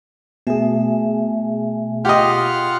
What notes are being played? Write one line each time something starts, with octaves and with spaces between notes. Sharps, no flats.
B2 A3 G#4 E5 G#5
F4 G4 D#5 F#5 F6